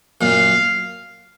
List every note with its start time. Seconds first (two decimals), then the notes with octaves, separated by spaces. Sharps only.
0.21 F#2 A#2 F5